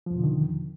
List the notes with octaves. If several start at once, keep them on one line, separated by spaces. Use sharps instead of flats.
E2 B2 D3 D#3 F3